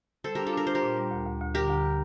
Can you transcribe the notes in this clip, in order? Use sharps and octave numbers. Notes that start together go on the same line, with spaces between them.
G3 A4 C5
D4 G4 A#4
F4 A4
D4 A#4
D4 C5
G4 A#4
A#2
G3
D2
D2
D2
D3 G4 A#4
D2